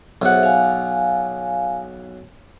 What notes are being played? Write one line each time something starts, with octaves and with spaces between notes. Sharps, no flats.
B1 G#4 C5 E5 F#5
F5 G#5